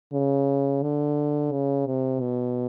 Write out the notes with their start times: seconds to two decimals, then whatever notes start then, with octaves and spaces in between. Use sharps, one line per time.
0.13 C#3
0.82 D3
1.52 C#3
1.86 C3
2.21 B2